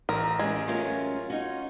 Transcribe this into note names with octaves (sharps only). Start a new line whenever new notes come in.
A1 A#4
G#3 C#4 G4
F#3 A3 C#4 F4 A#4
C#4 D#4 F#4